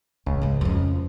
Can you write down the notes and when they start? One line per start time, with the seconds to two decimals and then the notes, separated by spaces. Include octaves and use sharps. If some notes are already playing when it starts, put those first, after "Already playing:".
0.26 D1 C#2
0.42 G#2 C#3
0.61 F2 C#4